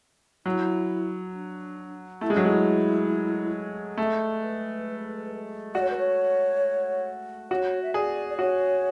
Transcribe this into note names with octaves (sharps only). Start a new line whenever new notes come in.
F#3 E4
D4
A3 E4
G#3
F#3 D4
G#3 E4
A3
B4
F#4 D5
C#5
B4
C#5
F#4 C#5
E5
G#4 D5
D5
F#4 C#5